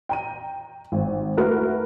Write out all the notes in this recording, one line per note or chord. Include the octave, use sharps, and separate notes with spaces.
G5 A#5 D#7
G#1
A3 E4 F#4 A#4 B4